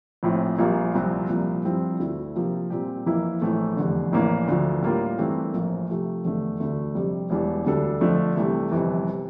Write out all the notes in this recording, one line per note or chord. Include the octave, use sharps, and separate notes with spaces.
A#1 A2 F3 C4
A#1 A#2 G3 A#3 F4
C2 A#2 F3 C4
C2 A#2 F3 A#3
G2 F3 C4 E4
D2 D3 A3 E4
C3 F3 A#3
A#2 G3 C4 G4
F2 E3 A#3 E4
A#1 A2 E3 A3
F1 E2 D3
A#1 A2 E3 A#3 D4
D2 D3 F3 A3
A2 G3 A#3 F4 A#4
G2 E3 A3 C4
A#1 A2 F3 A#3
C3 F3 A3
F1 E2 D3 A3
D2 D3 A3
F2 C3 G3
E1 E2 E3 G3 D4
D2 D3 G3 D4 A4
F2 D3 F3 A3
C2 C3 E3 A3
G1 F2 C3 E3
C3